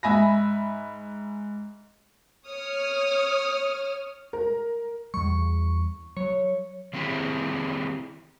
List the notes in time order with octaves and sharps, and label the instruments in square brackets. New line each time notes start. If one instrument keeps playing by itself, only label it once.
[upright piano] G#2 E5 G#5 B5 A#6
[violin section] C#5 D#6 F6
[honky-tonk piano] A#4
[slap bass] E2 G3 [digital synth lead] C#6
[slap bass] F#3 [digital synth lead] C#5
[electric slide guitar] D#3 A3 C4 E4 G4 G#4